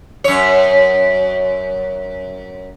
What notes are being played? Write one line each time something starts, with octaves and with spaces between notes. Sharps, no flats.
F#2 C#5